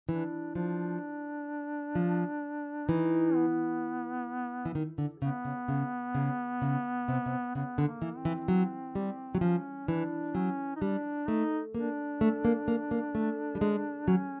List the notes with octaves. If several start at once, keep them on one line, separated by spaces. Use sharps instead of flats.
E3 D4
F3 D4
F3
E3 D#4
B3
E3
D#3
D3
C#3 B3
C#3
C#3
C#3
C#3
C3
C3
C#3 B3
D3
A#3
E3
C4
E3
F#3
G3
F#3
F3 C#4
E3 D4
F#3 C#4
D#4
G3 D4
A3 D#4
A#3 D4
A3
A#3
A#3
A#3
A3
G3
G#3
F#3 C#4